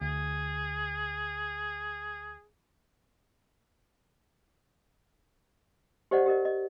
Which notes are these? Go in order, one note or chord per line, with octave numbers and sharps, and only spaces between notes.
D2 G#4
G4 C5 D5 D#5 F#5
G4 A#4 D#5
D#5